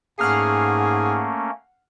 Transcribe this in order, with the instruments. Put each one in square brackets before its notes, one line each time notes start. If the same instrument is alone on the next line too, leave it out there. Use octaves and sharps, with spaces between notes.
[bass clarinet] G#2 [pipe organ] A3 A#3 C#4 [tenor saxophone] G#4 [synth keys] F#5 F6 C7